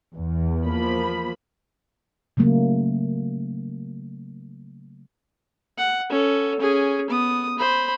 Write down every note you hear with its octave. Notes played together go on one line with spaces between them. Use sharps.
E2
F3 A#3 B5
C#3 F#3 A3 A#3
F#5
C#4 A4
C#4 G#4
B3 D#6
C5 B5